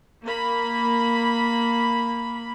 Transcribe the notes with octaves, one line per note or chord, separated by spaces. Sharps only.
A#3 B5